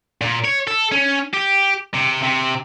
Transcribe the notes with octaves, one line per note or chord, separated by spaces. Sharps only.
A#2
C#5
A4
C#4
G4
C3
C3